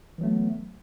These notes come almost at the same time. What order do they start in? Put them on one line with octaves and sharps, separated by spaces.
E3 F#3 A3 B3